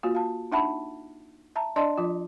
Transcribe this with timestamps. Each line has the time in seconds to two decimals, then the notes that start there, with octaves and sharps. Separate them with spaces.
0.03 A#3 F4 F#4 F5
0.15 F5 A5
0.52 D4 D#4 E5 F#5 A5 B5
1.56 E5 A5 A#5
1.76 D4 D5 D#5 A5 C6
1.97 F3 F4